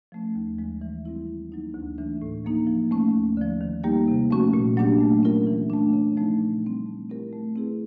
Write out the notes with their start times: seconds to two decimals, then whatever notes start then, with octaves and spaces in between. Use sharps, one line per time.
0.12 F3 A3 C#4
0.35 D#2
0.58 D3 F3 G#3
0.81 E3
1.05 G3 C4 E4
1.28 D#3
1.52 F#3 A#3 D#4
1.74 D2
1.98 C#3 E3 A3 D4
2.22 A2
2.45 F3 A#3 D#4
2.67 F3
2.91 A3 C#4
3.14 D#2
3.37 D3 F3
3.61 D#3
3.84 G3 A#3 D#4 G4
4.08 C3
4.31 F3 A3 C#4 F#4
4.54 A#2
4.77 F#3 A#3 D4 G4
5.00 A3
5.23 C#4 F4 A#4
5.47 E3
5.70 A3 D4
5.93 C#3
6.17 F3 A3 C4 D#4
6.40 A#2
6.63 G3 C4
6.86 A3
7.09 C4 E4 G4 A#4
7.33 A3
7.56 C4 E4 G#4 B4